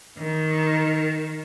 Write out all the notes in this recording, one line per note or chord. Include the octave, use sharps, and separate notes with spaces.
D#3